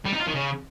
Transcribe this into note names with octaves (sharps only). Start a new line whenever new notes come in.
G3
D#4
F4
D#3
C#3